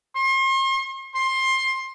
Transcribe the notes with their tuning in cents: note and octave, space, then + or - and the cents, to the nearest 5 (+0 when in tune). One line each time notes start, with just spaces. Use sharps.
C6 +40
C6 +20